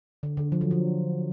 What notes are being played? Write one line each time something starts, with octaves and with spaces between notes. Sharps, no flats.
D3
D3
F3
F#3
F3